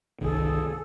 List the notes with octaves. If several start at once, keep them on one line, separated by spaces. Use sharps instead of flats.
G1 C2 D#3 G#4 A4